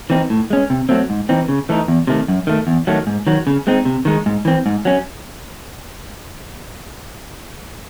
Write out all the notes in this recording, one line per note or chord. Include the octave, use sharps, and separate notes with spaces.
E3 C4 D#4
A2
G#3 C#4
C3
F#3 A3 C4
G#2
E3 C4 D#4
C#3
E3 A3 D#4
E2
C3 D#3 A3
F#2
D#3 A3
E2
D#3 F#3 A3
G#2
D#3 F#3
C#3
G#3 C4 D#4
C3
D#3 G#3 D#4
G#2
E3 C4
G#2
F#3 C#4